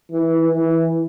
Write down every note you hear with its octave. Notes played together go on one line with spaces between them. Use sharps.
E3
E3